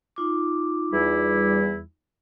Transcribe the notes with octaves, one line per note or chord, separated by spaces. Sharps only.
D#4 F4 D6
E2 G3 E4